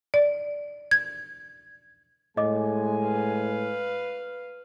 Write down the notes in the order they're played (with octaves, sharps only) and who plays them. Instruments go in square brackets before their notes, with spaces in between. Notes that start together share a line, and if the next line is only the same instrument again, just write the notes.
[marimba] D5
G#6
[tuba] A2 [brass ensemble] G#3 G#5 [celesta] D#5 D6
[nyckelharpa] B4 F5